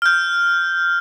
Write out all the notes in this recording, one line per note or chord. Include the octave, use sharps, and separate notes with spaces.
F6 G6